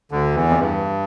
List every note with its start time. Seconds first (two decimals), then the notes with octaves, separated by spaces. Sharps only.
0.11 D2 D3
0.35 E2 E3
0.48 F2
0.58 G2